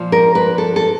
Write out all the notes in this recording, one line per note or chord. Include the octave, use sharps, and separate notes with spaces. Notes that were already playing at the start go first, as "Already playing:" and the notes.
Already playing: A#2 F3
A#4
B4
A4
A4